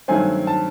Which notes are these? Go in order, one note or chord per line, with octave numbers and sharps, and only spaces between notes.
G2 D#3 F#3 A3 C4 G#5
A5